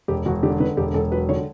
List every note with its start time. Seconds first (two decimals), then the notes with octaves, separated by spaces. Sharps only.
0.08 E1 G4
0.26 E1 F#4
0.43 D3 G4
0.60 D3 B4
0.77 E1 G4
0.94 E1 A4
1.12 F#3 B4
1.29 D3 C#5